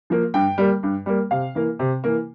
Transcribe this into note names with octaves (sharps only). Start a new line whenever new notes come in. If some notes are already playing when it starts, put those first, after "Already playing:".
F3 A#3
G2 G5
G3 A#3
G2
G3 A#3
C3 F5
E3 A#3
C3
E3 A#3